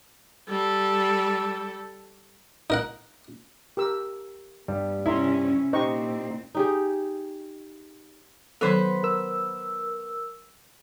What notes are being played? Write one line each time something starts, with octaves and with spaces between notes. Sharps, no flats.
G3 A4
D#4 A#4 F#5
G4 A#4 E6
G2 G3 B3
C3 C#4 E4 D#5 A#5 C6
A#2 C4 D#4 G4 C5 D#5 C#6
D#4 G4 G#4
D#3 F#3 B3 A4 B4 C5
A#4 E6